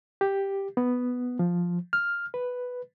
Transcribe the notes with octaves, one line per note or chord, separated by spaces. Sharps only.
G4
B3
F3
F6
B4